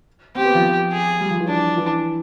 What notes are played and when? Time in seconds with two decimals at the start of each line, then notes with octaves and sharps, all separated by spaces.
0.35 C4 G4
0.45 B3
0.55 F3
0.92 G#4
1.20 G3
1.30 F3
1.40 E3
1.48 D4
1.77 E3